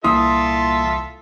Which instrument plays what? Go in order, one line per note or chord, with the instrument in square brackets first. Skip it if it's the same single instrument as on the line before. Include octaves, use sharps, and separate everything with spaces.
[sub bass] C2 [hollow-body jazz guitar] A#2 E3 [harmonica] F4 A4 E5 [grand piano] C6 D#6